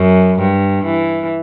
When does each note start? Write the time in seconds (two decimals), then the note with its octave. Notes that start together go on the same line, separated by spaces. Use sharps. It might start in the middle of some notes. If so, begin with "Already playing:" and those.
Already playing: F#2
0.39 G2
0.85 E3